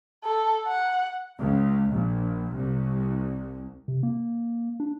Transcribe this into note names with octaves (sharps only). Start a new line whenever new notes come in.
A4
F#5
C#2
A#1
C2
C3
A#3
D4